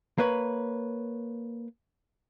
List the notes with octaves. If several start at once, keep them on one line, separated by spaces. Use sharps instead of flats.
A#3 B4 C#5